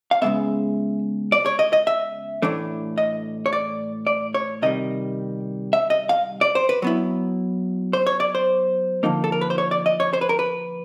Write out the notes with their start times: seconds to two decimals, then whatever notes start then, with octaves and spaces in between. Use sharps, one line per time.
0.11 F5
0.22 C#3 E3 G#3 B3 E5
1.32 D5
1.46 C#5
1.59 D#5
1.73 D#5
1.87 E5
2.42 A2 E3 A3 D4
2.98 D#5
3.46 C#5
3.53 D5
4.07 D5
4.34 C#5
4.62 C3 D#3 G3 D#5
5.73 E5
5.90 D#5
6.09 F5
6.41 D5
6.55 C5
6.69 B4
6.82 F#3 B3 E4
7.93 C5
8.07 C#5
8.20 D5
8.35 C5
9.03 D3 F3 A#3 D#4
9.24 A4
9.32 A#4
9.41 B4
9.50 C5
9.58 C#5
9.71 D5
9.86 D#5
10.00 C#5
10.13 C5
10.21 B4
10.29 A#4
10.39 B4